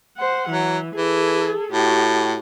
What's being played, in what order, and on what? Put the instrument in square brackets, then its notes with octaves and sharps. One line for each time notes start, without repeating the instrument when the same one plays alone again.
[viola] C5 F#5
[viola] E3 [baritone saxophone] F#3
[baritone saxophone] E3 [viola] G#4 A4
[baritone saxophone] A2 [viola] F#4 G4